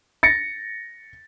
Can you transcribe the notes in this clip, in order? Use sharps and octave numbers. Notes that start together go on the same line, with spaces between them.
A6 A#6 C#7